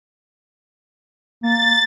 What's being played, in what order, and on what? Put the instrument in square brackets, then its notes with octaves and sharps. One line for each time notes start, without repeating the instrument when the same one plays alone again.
[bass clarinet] A#3 [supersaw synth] A6